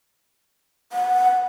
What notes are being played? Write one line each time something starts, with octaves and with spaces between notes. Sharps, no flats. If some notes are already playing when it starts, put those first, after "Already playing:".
F#5